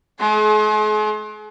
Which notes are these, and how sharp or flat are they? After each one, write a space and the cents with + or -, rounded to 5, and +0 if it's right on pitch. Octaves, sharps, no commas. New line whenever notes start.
G#3 +45 G#4 +35